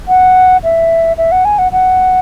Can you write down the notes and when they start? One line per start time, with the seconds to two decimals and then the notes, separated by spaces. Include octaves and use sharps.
0.08 F#5
0.64 E5
1.18 E5
1.32 F#5
1.45 G#5
1.59 F#5
1.72 F#5